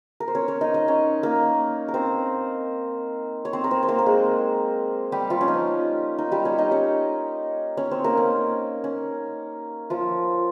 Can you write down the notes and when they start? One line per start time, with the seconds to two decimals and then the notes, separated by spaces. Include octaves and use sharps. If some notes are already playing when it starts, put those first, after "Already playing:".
0.20 A#4
0.28 C5
0.35 C#4 C#5
0.48 C#4 C#5
0.61 D#4 D#5
0.74 D#4 D#5
0.88 C#4 C#5
1.23 A#3 A#4
1.88 A#4
1.94 C4 C5
3.45 C#5
3.53 C4 C5
3.64 A#4
3.71 C4 C5
3.83 C5
3.88 A#3 A#4
3.98 A#4
4.06 G#3 G#4
5.12 G3 G4
5.30 F3 F4
5.41 C#4
5.48 D#4
6.18 D#4
6.32 G3 G4
6.45 C#4 C#5
6.58 D#4 D#5
6.71 C#4 C#5
7.77 C#4 C#5
7.91 C4 C5
8.04 A#3 A#4
8.17 C#4
8.84 C#4
9.90 F3 F4